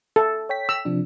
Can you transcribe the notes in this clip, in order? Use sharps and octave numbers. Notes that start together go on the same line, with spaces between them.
A4
C#5 G5 B6
E6
C3 F3 D4